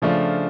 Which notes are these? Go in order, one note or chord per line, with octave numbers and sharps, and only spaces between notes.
C#3 F3 A3 D4 F4